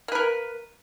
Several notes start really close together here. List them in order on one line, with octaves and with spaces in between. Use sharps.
A#3 B4 A#4